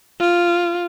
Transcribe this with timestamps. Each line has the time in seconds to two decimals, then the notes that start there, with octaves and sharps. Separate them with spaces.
0.20 F4